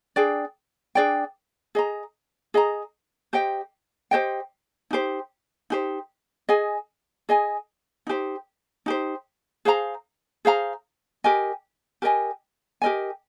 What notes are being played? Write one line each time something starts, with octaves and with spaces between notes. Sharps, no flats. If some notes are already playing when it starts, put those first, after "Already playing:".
D4 G#4 D5 G5
D4 G#4 D5 G5
G#4 D#5 A#5
G#4 D#5 A#5
G4 C5 D#5 G5
G4 C5 D#5 G5
D#4 G4 C5
D#4 G4 C5
G#4 D#5 G#5
G#4 D#5 G#5
D#4 G4 C5
D#4 G4 C5
G#4 C5 F5 A#5
G#4 C5 F5 A#5
G4 A#4 D#5 G#5
G4 A#4 D#5 G#5
G4 A#4 D#5 G#5